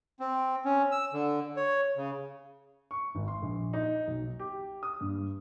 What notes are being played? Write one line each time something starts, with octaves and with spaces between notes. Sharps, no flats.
C4
C#4
E6
D3
C#5
C#3
C#6
G#1
C6
A#1
D#4
B1
G4
D#6
G2